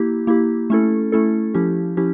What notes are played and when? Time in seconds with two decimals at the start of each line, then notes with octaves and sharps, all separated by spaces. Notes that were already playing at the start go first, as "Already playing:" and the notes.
Already playing: A#3 E4 G4
0.27 A#3 E4 G4
0.70 A3 C#4 E4 A4
1.12 A3 C#4 E4 A4
1.54 F3 C#4 E4 G4
1.97 F3 C#4 E4 G4